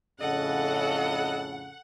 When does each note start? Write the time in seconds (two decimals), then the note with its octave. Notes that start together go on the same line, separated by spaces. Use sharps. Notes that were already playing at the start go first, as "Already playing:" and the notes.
0.21 F2 A2 C#3 A4 D#5 F#5